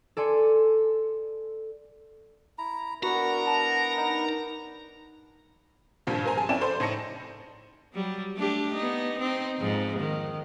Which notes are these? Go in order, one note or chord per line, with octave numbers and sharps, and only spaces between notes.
A4 D5 G#5 C6 C#7
E4 A#5
B3 D4 E4 F#4 A#4 F#5 A#5
A5
D#4
G#1 G2 A#2 F3 G3
A#4 C5 G#5 A#5
G#4 G#5 A5
F2 C#4 E4 D5 G5 E7
A4 C5 D5 B5 C6
A2 D#4 C5 A5 A#6 C#7
F#3 G3
A3 D4 G4
B3 D#4
C4 D#4
F2 G#2
D#3